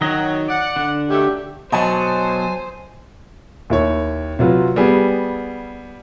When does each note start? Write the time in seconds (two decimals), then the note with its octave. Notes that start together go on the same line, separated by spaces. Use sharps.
0.01 D#3 F#3 D#5
0.48 D5 F#5
0.76 D3 D4
1.10 D#3 F#3 A3 G4
1.72 B2 F#3 C5 D#5 G#5 A5
3.70 D#2 E4 C#5
4.39 C3 F#3 F4 B4
4.76 G3 B3 G#4